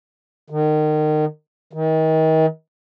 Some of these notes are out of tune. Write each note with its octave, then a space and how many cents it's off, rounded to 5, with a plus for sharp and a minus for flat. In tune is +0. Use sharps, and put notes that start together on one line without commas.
D#3 -30
D#3 +35